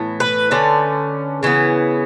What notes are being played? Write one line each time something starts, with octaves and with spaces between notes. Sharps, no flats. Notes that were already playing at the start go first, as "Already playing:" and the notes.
Already playing: A2 E3 B3
B4
D3 A3 C#4
C#3 E3 B3